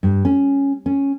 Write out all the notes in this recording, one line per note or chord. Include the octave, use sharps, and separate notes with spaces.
G2
C#4
C#4